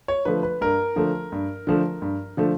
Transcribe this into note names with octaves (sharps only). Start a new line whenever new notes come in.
C#5
D3 F3 A3 B4
B4
G2 A#4
D3 F3 A3
G2
D3 F3 A3
G2
D3 F3 A3